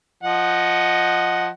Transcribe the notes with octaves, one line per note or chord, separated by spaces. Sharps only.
F3 D#5 F#5